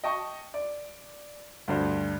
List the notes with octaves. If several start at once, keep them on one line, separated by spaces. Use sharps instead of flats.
D#5 G5 A5 C#6
D5
D2 G2 C5